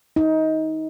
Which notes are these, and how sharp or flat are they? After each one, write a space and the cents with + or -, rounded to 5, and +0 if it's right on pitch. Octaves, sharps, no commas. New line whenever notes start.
D#4 +20